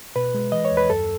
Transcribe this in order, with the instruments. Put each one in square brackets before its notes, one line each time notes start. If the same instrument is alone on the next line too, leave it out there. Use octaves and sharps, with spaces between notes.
[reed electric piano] B2 B4
G#3
E3 D#5
C#5
D#2
B4
F#2 A4